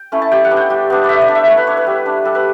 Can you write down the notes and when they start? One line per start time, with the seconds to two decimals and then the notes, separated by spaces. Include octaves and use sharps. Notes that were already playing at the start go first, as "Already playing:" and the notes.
Already playing: G5
0.12 A3 C#4 E4
0.22 A5
0.31 G3 G5
0.45 F#5
0.51 B3 D4
0.57 G5
0.70 G3
0.90 B3 D4
1.04 D5
1.09 A3 E5
1.21 D5
1.28 D4
1.35 E5
1.47 A3 C#5
1.57 B4
1.67 D4 C#5
1.77 B4
1.87 G3
2.06 D4
2.25 G3 A4
2.35 B4